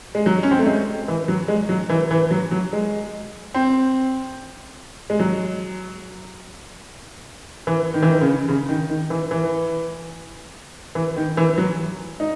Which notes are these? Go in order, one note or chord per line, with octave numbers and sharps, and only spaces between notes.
G#3
F#3
C#4
C4
A3
G#3
E3
F#3
G#3
F#3
E3
E3
F#3
F#3
G#3
C4
G#3
F#3
E3
D#3
E3
D#3
C#3
C#3
D#3
D#3
E3
E3
E3
D#3
E3
F#3
D#4